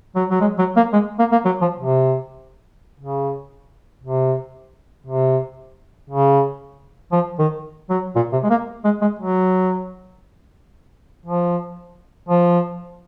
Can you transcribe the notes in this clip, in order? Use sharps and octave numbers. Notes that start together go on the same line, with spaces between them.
F#3
F#3
G#3
F#3
A#3
G#3
A#3
A#3
F#3
F3
C3
C#3
C3
C3
C#3
F3
D#3
F#3
A#2
C3
G#3
A#3
G#3
G#3
F#3
F3
F3